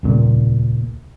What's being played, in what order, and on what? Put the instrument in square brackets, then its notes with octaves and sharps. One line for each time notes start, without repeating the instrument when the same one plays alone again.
[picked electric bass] D#1 C#2 A#2